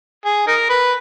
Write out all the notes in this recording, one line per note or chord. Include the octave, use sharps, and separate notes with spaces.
G#4
D#4 A#4
B4